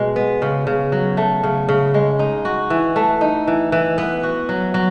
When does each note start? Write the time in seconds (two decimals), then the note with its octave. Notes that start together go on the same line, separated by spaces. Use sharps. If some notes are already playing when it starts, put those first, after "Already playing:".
Already playing: B2 G#3
0.16 B3
0.42 C#3
0.67 C#3
0.92 F#3
1.17 A3
1.43 C#3
1.69 C#3
1.94 G#3
2.19 D#4
2.45 F#4
2.70 E3
2.96 A3
3.21 D#4
3.47 E3
3.72 E3
3.98 B3
4.23 F#4
4.49 F#3
4.74 F#3